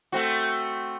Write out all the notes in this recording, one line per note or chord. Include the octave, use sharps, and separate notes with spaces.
A3 C4 F#4